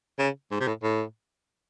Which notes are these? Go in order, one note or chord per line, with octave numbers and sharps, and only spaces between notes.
C#3
G#2
C3
A2
A2